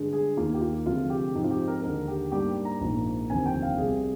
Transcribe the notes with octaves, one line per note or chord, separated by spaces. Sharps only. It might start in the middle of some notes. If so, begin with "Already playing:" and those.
Already playing: G2 D3 G#3
G#4
D#2 D#3 A#3 F4
G4
F4
D2 C3 F3 G#3 F4
G4
G#2 F3 C4 D#4
F4
G4
A#4
D#2 D3 G#3 D#4 A#4
G4
G#2 G3 A#3 D4 G4
A#5
A#1 G#2 F3 A#3
F1 D#2 D3 F3 C4 G#5
G5
F5
C2 C3 G3 G#4